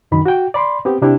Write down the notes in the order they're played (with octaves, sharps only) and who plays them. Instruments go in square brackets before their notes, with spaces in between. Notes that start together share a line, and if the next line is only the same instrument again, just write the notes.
[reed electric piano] C2 F#2 D#3 B5
F#4 G5
D5 B5 C6
B3 C4 G4
C3 D4 E4 G4